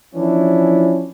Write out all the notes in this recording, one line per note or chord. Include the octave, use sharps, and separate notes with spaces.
E3 F3 C#4 D4 E4